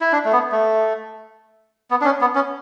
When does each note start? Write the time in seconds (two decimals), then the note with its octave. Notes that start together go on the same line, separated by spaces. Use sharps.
0.01 E4
0.12 D4
0.25 A3
0.33 B3
0.52 A3
1.91 B3
2.01 D4
2.05 C#4
2.21 B3
2.35 C#4